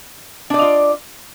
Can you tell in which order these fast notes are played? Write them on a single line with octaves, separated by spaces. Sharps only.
D4 D5 D#5 F4